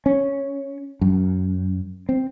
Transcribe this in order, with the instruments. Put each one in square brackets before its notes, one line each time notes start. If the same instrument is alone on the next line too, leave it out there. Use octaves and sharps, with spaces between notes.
[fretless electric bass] C#4
F#2
C4